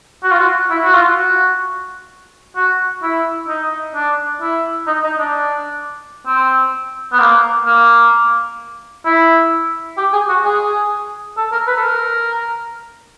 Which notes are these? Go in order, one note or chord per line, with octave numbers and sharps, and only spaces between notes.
F#4
F4
F#4
E4
F#4
F4
F#4
F#4
E4
D#4
D4
E4
D#4
D#4
D4
C4
B3
A#3
A#3
E4
G4
G#4
F#4
G#4
A4
A#4
B4
A4
A#4